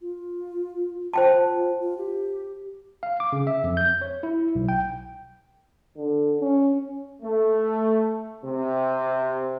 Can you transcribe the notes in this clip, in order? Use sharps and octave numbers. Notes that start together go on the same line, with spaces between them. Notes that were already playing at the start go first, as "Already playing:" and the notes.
F4
F4 C5 G5 A5
F4
G4
F5
D6
C#3
E5
F2
G6
C#5
E4
B1
G5
D3
C#4
A3
C3